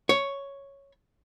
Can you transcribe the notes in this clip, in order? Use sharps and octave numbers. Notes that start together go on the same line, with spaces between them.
C#5